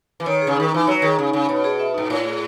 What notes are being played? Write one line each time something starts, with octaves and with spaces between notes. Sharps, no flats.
E3
D#3 C#5
G#4
C#3
D#3 D#4
E3 D#4
F#3 C#5
D#3 G#4
C#3 D#4
C#3 D#4
B2 C#5
G#4
E5
G#2 D#4
A2 C#5
G#4